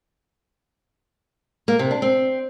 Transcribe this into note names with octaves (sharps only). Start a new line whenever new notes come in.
A#3
C3
D4
C4